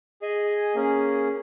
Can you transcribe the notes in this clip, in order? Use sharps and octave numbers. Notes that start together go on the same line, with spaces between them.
G#4 D#5 G#5
A#3 C#4 G#4